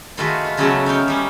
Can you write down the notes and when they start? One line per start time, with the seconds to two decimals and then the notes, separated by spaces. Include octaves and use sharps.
0.17 D#3 A3 F4 F#4 G#4 B4
0.44 F4 B4
0.57 C#3 F#3 A3 B3 C#4 A4
0.86 D#4 C#5 F5 G5
1.08 G3 C#4